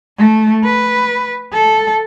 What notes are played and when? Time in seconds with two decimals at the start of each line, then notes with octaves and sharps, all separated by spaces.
0.18 A3
0.64 B4
1.53 A4